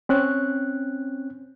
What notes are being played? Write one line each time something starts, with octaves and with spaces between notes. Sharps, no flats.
C4 C#4 F#6